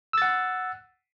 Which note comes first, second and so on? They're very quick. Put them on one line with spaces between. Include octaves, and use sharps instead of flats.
E6 A6 F#5